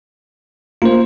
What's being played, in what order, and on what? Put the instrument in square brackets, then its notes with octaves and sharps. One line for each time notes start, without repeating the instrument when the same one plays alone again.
[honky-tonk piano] A#3 [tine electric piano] F4 C5